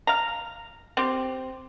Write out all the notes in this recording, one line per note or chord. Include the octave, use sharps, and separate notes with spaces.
F5 A#5
C4 G4